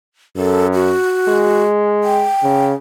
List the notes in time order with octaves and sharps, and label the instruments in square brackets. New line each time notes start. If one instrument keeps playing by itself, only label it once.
[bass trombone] F#2 [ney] A4
[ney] F#4
[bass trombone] G#3
[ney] G5
[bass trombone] C#3